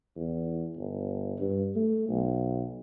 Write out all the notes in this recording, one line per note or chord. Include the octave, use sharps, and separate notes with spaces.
E2
G1
G2
A3
B1